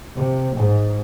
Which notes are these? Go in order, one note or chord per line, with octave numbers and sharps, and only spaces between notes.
C3
G#2